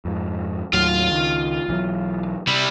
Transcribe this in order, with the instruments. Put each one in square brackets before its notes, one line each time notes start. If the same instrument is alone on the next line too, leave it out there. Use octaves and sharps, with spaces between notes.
[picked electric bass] F2 G#2
[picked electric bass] D#2 A2 F#3 [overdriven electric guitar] F4 F5
[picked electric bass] C#2 D#3
B1 E3 F#3
[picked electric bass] C3 [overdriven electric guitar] G3 E4